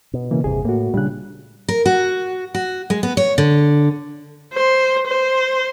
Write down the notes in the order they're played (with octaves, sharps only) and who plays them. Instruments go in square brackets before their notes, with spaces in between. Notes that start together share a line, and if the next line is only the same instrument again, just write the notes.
[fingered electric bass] B2
[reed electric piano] C#3 E3 A#3
[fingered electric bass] G1 E2 C3 [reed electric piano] G#4
[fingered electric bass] A2 [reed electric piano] A#3 F#4
[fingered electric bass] A#2 C#3 [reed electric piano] G3 D4 F#6
[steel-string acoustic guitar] A#4
F#4
F#4
G#3
B3
C#5
D3
[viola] C5
C5